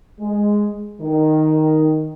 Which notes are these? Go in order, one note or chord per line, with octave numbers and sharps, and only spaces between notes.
G#3
D#3